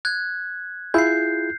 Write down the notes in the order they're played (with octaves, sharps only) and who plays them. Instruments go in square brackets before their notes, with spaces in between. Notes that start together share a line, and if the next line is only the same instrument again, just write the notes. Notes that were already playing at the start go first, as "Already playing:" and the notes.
[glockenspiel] F#6 G#6
[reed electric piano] E4 F4 G#4 [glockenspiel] G6 C7